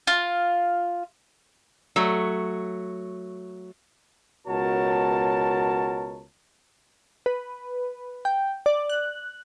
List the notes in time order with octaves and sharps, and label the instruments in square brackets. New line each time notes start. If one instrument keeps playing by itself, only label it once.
[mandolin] F4
[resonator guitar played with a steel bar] F#3 A3
[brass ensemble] C#2 B2 F#4 A#4 C#5 A5
[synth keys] B4
G5
D5
F#6